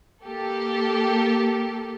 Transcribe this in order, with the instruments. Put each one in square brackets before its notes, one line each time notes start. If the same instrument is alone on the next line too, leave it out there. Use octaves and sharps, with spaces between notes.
[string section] A#3 G4 A4